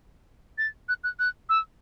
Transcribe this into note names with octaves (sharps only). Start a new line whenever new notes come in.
A6
F#6
F#6
F#6
E6